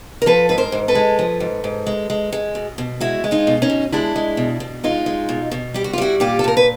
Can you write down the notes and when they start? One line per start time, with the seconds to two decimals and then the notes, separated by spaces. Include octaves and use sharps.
0.22 A#4
0.26 F3 A4 B4
0.49 G#2 B4
0.58 A#4 C5
0.72 G#2
0.88 A4 B4
0.95 G#3
1.19 F3
1.40 G#2
1.64 G#2
1.87 G#3
2.10 G#3
2.33 G#3
2.55 B2
2.78 B2
3.00 G#3 E4 F#4
3.24 G#3
3.31 D#4 F4
3.47 B2
3.62 C#4 D#4
3.70 B2
3.92 G#3 D4 E4
4.16 G#3
4.37 B2
4.60 B2
4.84 G#3 D#4 F4
5.06 G#3
5.29 B2
5.52 B2
5.74 G3 G4
5.84 F#4
5.93 F4
5.98 G3 E4 F#4
6.20 A#2 F4 G4
6.39 A4
6.44 A#2 A#4
6.57 B4